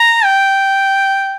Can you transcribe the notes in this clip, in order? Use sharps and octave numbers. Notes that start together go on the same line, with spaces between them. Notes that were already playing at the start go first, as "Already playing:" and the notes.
Already playing: A#5
G5